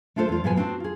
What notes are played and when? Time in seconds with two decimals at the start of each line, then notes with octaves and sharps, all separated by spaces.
0.16 A3 D4 F4 A4 C5
0.29 E2 F4
0.44 G#2 B2 F3 G#3 B4 G#5
0.56 B3 C4 D4 F4 F#4
0.80 F4 G#4